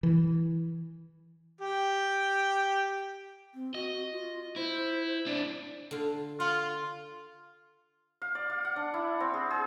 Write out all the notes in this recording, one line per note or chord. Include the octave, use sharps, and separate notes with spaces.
E3
G4 G5
C4
F#4 D#5
F4
E4 C5
D4 E4 D5
D3 F4
F4 F#5
F5
D5
F5
F#5
D4
E4
C4
G#4
G#4